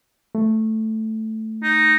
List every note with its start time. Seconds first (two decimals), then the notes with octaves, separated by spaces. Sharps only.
0.35 A3
1.63 D#4